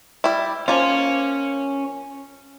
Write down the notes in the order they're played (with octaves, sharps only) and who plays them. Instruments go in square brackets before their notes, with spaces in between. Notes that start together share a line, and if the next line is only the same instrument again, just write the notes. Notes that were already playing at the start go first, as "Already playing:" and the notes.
[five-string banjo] G3 E4
[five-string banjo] F3 A#3 F4 [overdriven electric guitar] C#4